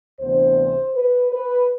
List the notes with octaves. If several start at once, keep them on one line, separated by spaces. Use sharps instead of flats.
D2 C3 E3 B3 D4 C5
B4
B4